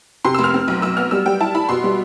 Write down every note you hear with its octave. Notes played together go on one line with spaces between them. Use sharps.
C3 C6
E6
F1
F6
C4
B1
B1 E6
B3 F6
G3 E6
G3 G5
E4 A5
E4 B5
B2 C6
G3